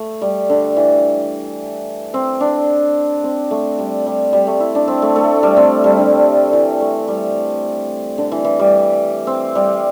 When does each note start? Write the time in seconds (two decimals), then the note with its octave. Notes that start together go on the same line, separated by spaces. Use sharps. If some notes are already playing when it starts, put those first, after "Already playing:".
Already playing: A3
0.21 G3
0.49 D3
0.76 E3
2.14 C4
2.40 D4
3.24 C4
3.51 A3
3.79 G3
4.06 G3
4.33 G3
4.47 A3
4.60 E4
4.75 D4
4.88 C4
5.02 A3
5.16 A3
5.43 G3
5.57 C4
5.84 G3
5.98 D3
6.53 E3
6.81 A3
7.08 G3
8.18 D3
8.32 E3
8.45 E3
8.59 G3
9.27 C4
9.55 G3